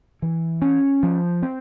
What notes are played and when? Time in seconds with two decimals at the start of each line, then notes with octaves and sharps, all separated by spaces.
0.22 E3
0.62 C#4
1.03 F3
1.43 C4